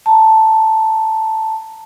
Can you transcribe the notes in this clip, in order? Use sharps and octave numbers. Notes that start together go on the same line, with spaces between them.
A5 A#5